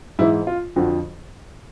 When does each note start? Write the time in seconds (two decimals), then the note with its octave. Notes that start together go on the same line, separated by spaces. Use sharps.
0.19 G#2 E3 E4
0.47 F4
0.76 F2 D3 F3 F#4